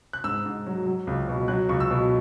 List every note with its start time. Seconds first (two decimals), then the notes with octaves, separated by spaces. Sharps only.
0.13 F#6
0.24 G#2 E6
0.46 G#2
0.66 F#3
0.86 F#3
1.07 C#2
1.28 B2
1.48 F#3 F#6
1.69 C#2 C#6
1.80 E6
1.91 B2